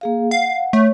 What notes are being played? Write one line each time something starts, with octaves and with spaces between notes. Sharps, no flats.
A#3 G#4 F5
F5 F#5
A3 C#5